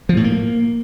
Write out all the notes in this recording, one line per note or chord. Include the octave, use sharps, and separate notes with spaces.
F3
A2
A#3